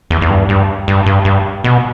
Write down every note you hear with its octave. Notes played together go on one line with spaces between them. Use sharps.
E2
E2
G2
G2
G2
G2
G2
B2